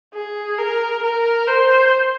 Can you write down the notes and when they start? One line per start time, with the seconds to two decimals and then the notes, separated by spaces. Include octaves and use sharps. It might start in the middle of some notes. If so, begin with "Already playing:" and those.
0.13 G#4
0.59 A#4
1.03 A#4
1.47 C5